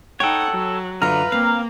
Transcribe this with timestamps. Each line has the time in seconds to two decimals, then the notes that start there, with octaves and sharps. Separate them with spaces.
0.20 D#4 A4 C#5 F#5 G5
0.51 F#3
1.02 F#2 D3 F4 B4 A#5 F6
1.32 A#3 C4 F5